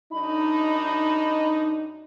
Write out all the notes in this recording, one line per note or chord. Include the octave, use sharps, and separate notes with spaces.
F#2 D4 D#4 B5